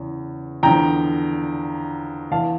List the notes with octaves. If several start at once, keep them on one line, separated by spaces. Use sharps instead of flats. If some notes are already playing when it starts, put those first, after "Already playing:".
Already playing: E2 C#3 E3
E2 D3 F3 G5 A#5
E2 E3 F5 A5